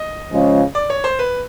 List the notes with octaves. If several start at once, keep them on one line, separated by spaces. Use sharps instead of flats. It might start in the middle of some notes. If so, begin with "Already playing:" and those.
Already playing: D#5
C#3 F3 G#3 C#4 F4
D5
C#5
C5
B4